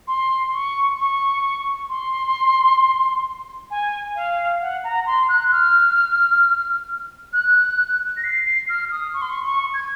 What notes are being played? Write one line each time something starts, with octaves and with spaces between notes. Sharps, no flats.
C6
C#6
C#6
C6
G#5
F5
F#5
A#5
C6
F#6
F6
F#6
A#6
C7
C7
F6
D#6
C#6
C6
C#6
C#6
G#6